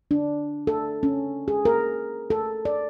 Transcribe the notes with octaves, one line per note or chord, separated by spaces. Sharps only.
D4
A4
C#4
G#4
A#4
A4
D5